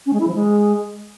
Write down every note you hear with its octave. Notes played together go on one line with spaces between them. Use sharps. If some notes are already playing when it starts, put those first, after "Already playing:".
C#4
G#3
E4
F3
G#3